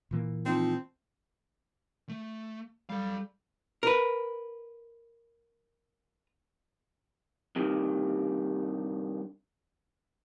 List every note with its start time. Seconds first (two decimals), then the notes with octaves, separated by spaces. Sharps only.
0.11 A#2 E3 A#3
0.46 F3 C4 D#4
2.09 A3
2.90 G3 A4 F5
3.83 A#4 B4
7.56 G2 C3 D#3